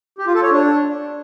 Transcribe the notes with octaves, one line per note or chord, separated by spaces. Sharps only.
G4
F4
A4
C#5
D4